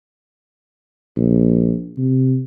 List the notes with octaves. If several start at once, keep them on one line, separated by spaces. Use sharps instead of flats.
A#1
C3